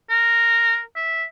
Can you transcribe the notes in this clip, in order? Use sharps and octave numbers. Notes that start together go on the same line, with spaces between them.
A#4
E5